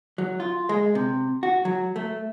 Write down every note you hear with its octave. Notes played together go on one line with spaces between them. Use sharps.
F#3
F4
G#3
C3
F#4
F#3
A3